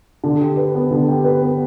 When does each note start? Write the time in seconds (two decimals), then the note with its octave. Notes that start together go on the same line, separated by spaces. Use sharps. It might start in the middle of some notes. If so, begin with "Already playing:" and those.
0.24 D3
0.41 G4
0.57 B4
0.75 B3
0.91 D3
1.08 G4
1.24 B4
1.42 B3